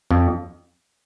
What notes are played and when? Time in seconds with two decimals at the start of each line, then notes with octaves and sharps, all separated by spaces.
0.11 F2